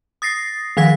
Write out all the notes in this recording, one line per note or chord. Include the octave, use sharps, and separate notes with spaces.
D#6 A6 A#6 C7
D#3 F3 F5 G#6 B6